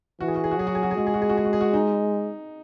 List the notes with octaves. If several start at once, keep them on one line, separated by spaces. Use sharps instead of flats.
E3 F#4
G#4
F#4
G#4
F#4
F#3 G#4
F#4
G#4
F#4
G#4
G#3 F#4
G#4
F#4
G#4
F#4
G#4
F#4
G#4
F#4
D#4